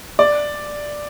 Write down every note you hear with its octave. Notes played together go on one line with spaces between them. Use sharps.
D5